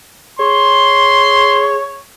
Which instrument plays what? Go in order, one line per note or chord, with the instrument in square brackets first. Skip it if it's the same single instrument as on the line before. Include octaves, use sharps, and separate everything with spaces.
[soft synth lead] G#4 [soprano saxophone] C#5 [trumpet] C6